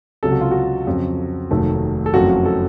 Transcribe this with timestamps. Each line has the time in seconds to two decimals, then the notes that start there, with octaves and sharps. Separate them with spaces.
0.23 C#2 C3 F#3 A4
0.32 F#4
0.41 F4
0.51 F#4
0.87 F2 C#3 F#3
1.51 F1 D#2 D#3 F#3 A3
2.06 A4
2.13 F#1 F2 C#3 F#3 A3 F#4
2.30 F#4
2.45 A4